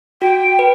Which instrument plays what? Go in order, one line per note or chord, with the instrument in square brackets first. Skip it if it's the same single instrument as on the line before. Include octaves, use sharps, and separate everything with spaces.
[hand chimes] F#4 [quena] G5
[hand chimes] B4